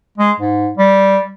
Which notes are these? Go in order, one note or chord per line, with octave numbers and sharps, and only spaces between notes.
G#3
G#2
G3